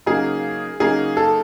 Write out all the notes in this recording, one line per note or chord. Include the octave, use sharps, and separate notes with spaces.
C#3 F#3 A#3 D#4 G#4
C#3 F#3 A#3 D#4 G#4
A4